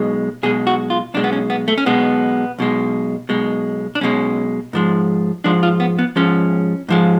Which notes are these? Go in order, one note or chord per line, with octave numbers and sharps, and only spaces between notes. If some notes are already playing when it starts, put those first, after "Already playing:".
Already playing: B1 B2 G#3
B1 B2 G#3 G#4
F#4
F4
B1 B2 G#3 D4
B3
C#4
B3
A3
C#4
B1 B2 G#3 B3
B1 B2 G#3
B1 B2 G#3
D4
B1 B2 G#3 C#4
G#2 F3 G#3
G#2 F3 G#3 D4
F4
B3
B3
G#2 F3 G#3 C#4
G#2 F3 G#3